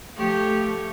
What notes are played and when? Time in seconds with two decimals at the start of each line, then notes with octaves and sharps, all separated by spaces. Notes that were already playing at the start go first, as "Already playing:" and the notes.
0.16 F3 A3 G4 C#5